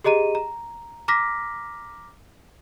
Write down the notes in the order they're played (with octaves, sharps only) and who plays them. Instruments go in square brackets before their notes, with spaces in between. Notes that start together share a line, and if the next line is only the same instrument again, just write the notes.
[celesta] G4 G#4 D#5 A#5 D#7
A#5
A#5 D6 F6 A#6 B6